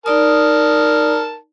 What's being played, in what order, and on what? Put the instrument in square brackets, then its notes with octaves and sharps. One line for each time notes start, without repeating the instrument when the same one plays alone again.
[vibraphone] D#4 D5 D#6 [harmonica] A#4 A5